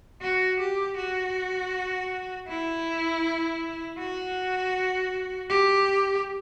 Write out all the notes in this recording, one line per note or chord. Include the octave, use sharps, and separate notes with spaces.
F#4
G4
F#4
E4
F#4
G4